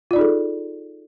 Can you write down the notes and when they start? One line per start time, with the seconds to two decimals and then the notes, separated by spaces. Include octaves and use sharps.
0.11 F4
0.13 D5
0.16 D#4
0.19 G#4
0.21 A4